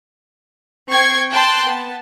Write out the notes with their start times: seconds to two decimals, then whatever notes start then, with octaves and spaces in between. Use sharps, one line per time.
0.92 C4 G5 C#6 G#6 C7
1.31 G5 A5 C6 F#6
1.65 B3 A5